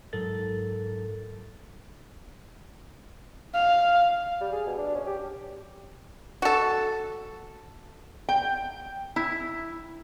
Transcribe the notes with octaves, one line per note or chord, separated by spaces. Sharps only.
G#2 F#3 A4 A#4 A6
F5
G3
G#4
B2
D4
C#4
G4
F#4 A4
G5
E4